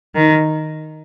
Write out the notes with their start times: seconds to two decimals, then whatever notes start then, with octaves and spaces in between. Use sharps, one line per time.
0.15 D#3